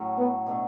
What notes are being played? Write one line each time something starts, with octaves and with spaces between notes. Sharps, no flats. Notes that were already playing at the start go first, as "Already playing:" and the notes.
Already playing: A2 F#3 A3 C#4
B3
B2 A3 D4